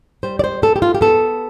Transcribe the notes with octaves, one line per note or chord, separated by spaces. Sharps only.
G3 C5
D5
C5
B3 A4
G4
F4
G4
B3 A4